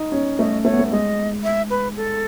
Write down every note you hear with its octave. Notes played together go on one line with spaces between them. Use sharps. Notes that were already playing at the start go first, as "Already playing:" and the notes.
Already playing: D#4
C#4
A3 D#5
A3 C#5
B3
A3
G#3 D#5
E5
B4
A4